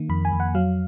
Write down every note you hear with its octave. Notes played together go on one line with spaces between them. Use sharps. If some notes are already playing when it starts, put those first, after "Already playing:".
Already playing: D#3 A#3
F2 B5
G#5
F2
F#5
F#3 F5